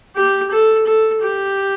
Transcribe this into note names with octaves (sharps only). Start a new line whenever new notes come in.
G4
A4
A4
G4